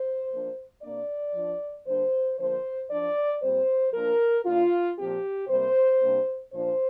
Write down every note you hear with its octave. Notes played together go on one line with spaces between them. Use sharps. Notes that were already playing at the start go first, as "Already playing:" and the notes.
Already playing: C5
F3 A#3 D4
C3 A#3 D4 D5
F3 D4
D3 G3 A#3 D4 C5
D3 F3 A#3 D4 C5
F3 D4 D5
A#2 G3 C4 C5
F3 A#3 D4 A#4
D3 A#3 D4 F4
A#2 F3 C4 G4
C3 G3 A#3 C5
C3 G3 A#3 D4
A#2 F3 D4 C5